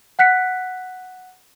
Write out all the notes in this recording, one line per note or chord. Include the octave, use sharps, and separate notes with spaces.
F#5 F#6 B6 C#7